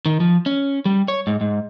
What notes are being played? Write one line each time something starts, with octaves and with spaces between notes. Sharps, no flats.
D#3
F3
C#4
G3
C#5
G#2
G#2